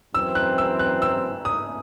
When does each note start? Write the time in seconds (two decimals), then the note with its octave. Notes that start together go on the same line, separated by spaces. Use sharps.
0.14 F#2 E3 C4 E6
0.35 F#6
0.58 E6
0.79 F#6
1.02 E6
1.45 D#6